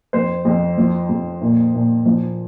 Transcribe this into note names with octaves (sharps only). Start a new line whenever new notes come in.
F2 C5
F2
F3
F2
A#2
A#2
F3